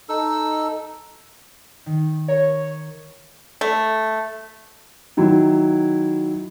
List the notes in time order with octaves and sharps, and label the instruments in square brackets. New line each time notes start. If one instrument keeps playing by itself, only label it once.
[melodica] D#4 A4 E6
[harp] D#3
[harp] A#4 C#6 [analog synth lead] C#5
[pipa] A3
[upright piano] D#3 F#3 E4